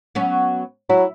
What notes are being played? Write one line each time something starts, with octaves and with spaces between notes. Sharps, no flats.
F#3 B3 C#4
F#3 E4